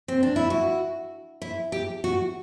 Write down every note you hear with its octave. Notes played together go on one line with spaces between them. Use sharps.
C4
D4
E4
F#4
E4
G4
F#4